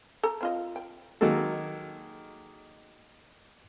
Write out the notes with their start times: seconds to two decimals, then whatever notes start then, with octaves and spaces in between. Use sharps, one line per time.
0.23 A4 A#5
0.41 C4 F4 D#5
0.76 G5
1.21 D#3 F#3 G#3 A#3 A4